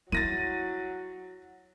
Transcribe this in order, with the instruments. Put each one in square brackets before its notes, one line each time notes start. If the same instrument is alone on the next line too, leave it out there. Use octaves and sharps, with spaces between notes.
[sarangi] F#3 [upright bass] E4 [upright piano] A6 A#6 D#7